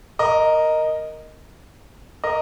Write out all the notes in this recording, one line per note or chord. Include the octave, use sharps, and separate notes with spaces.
A#4 D#5
A#4 D#5